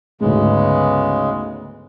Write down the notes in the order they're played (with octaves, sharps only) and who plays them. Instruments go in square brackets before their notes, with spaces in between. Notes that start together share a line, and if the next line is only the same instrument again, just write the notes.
[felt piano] D2 G#2 [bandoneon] C#3 G#3 [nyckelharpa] B3